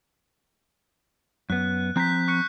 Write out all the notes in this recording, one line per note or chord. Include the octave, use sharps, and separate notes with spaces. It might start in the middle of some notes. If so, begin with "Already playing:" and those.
F#2 B3 F#6
F3 C4 A#5 F#6 G6 B6
C#6 F#6 C#7